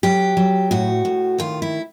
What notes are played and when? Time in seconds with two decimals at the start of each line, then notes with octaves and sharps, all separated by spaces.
0.03 F#3 G4
0.37 F#3
0.71 A2 F#4
1.05 A2
1.38 D#3 F4
1.62 E4